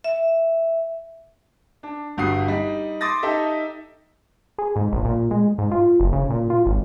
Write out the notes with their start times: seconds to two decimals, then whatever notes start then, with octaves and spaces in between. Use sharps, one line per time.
0.04 E5
1.83 D4
2.17 G1 G2 F#4 D#6 C7
2.48 G3 D#4
3.01 C6 D6 D#6 A6 A#6
3.23 D#4 G4 A4 E5
4.58 G#4
4.76 G#2
4.93 A#1
5.05 A#2
5.31 G#3
5.58 G#2
5.71 F4
6.00 F#1
6.13 C#3
6.30 A#2
6.50 F4
6.66 G#1